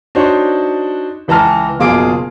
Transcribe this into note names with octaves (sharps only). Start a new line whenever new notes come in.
D4 D#4 F#4 C5 C#5
C#2 E3 A5 A#5 F6
F#1 B2 F4 G#4 D6 D7